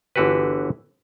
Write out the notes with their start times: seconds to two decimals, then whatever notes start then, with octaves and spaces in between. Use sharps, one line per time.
0.16 G1 D3 E3 F#4 G4 B4